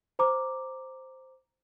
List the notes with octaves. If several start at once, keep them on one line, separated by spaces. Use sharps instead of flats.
C5 A#5 D6